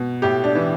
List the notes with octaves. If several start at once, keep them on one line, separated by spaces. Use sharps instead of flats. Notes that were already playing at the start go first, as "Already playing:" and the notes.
Already playing: B2
A2 G4
D4
E3